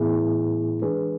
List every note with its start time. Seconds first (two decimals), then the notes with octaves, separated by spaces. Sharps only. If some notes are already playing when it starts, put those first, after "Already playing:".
Already playing: A2 E3 B3 E4 G#4
0.82 E3 G#3 D4 G#4 B4